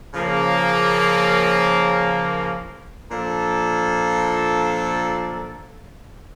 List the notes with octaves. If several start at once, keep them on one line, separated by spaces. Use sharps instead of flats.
C#3 F3 A#3
A#2 F3 A#3 D4 A4